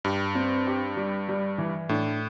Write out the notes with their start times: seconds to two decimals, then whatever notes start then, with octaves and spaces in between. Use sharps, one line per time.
0.05 G2 G4
0.35 C4
0.67 G4
0.97 G3
1.28 G3
1.58 E3
1.89 A2 D4